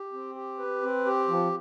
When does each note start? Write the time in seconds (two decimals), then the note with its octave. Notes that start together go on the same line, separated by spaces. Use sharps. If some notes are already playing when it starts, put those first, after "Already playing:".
Already playing: G4
0.13 C4
0.35 G4
0.59 B4
0.83 C4
1.06 G4
1.28 F3